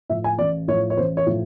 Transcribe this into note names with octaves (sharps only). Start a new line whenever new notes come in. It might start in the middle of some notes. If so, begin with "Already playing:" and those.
A2 F3 E5
G#5
A1 D5
A2 F3 C#5
C#5
A1 C5
C#5
A2 F3